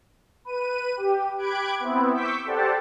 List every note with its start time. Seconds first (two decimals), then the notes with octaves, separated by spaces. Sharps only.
0.45 B4 D#7
0.97 G4
1.38 G4 B5 D6 F#6 G#6 D7
1.80 B3 C4 E4
2.14 C#6 D6 E6 G6 B6
2.45 G4 A4 C5 D5 F#5 A5